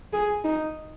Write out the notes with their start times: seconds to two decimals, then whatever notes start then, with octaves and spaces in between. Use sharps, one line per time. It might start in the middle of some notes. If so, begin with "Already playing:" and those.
0.13 G#4
0.44 D#4